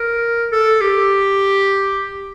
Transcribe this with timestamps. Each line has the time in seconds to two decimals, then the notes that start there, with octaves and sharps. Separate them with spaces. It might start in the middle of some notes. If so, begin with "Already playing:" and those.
Already playing: A#4
0.52 A4
0.81 G4